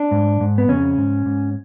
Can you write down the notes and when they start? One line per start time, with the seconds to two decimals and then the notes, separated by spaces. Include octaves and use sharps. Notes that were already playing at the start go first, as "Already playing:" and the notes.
Already playing: D4
0.11 G#2
0.40 G#2
0.58 B3
0.68 F2 C#3 C#4
0.98 G#2
1.26 G#2